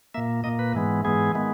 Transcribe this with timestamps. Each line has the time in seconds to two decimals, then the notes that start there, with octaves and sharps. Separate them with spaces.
0.14 A#2 A#3 E5
0.44 A#2 A#3 D#5
0.59 B4
0.74 G#2 E3 G#3 B3
1.05 G#2 E3 G#3 B3 G#4
1.35 D#3 G#3 B3